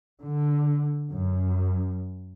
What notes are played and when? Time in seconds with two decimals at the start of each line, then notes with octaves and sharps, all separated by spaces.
0.23 D3
1.11 F#2